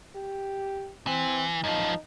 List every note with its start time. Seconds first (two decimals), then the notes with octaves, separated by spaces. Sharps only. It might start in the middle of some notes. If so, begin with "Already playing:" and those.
0.16 G4
1.07 E3 C4
1.64 F#2 F3 D#4